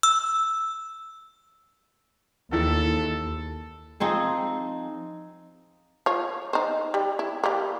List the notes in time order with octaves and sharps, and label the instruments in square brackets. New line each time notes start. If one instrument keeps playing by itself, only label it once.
[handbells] E6
[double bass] D#2 [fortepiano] D#3 E3 E4 [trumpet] A4
[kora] F3 C4 D#4 G#4
[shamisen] F4 C#5
D#4 C5
G3
E4
G3 A#3